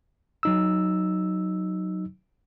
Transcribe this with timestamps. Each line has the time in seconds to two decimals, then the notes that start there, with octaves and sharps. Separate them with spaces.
0.43 F#3 D#4 E6